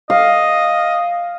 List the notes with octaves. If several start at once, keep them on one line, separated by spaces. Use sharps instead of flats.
D#5 F5